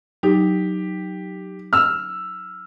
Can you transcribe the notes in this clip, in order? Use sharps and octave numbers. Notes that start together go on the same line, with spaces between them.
F#3 D#4 G4
E6 F6